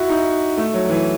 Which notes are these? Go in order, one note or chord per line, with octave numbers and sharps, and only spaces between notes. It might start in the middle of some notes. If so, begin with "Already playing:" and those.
Already playing: E4 F#4
D#4
A3
F#3
E3